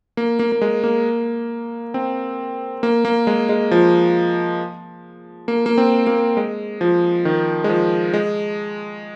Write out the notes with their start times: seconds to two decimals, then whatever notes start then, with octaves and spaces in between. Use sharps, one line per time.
0.17 A#3
0.39 A#3
0.52 A#3
0.62 G#3
0.84 A#3
1.94 C4
2.83 A#3
3.05 A#3
3.27 G#3
3.49 G#3
3.71 F3
5.48 A#3
5.66 A#3
5.78 C4
6.07 A#3
6.37 G#3
6.81 F3
7.25 D#3
7.64 G#3
7.69 F3
8.14 G#3